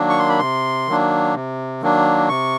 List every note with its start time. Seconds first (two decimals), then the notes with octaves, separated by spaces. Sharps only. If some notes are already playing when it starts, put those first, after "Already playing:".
Already playing: D#3 F#3 A#3 D4
0.09 C#6
0.19 C6
0.29 B5
0.39 C3 C6
0.88 D#3 F#3 A#3 D4
1.35 C3
1.82 D#3 F#3 A#3 D4
2.29 C3 C#6